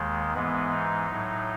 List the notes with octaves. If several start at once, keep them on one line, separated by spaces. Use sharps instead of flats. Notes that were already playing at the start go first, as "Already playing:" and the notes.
Already playing: D#2 D#3 G#3
G#2 E3 G#3 B3
D#4
A2 F#3